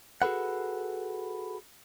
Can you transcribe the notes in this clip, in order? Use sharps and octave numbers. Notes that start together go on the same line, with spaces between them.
F#4 G#4 A4 B4 F#5